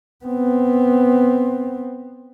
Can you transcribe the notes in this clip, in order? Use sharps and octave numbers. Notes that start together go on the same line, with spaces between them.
B3 C4